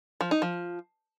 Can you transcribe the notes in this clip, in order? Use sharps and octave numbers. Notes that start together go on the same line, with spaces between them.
F3
D#4
F3